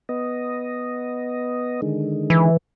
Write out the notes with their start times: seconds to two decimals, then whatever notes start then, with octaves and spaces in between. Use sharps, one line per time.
0.09 B3 D#5
1.82 D3 D#3 G#3
2.30 E3